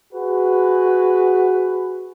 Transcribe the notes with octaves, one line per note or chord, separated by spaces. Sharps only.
F#4 G#4 B4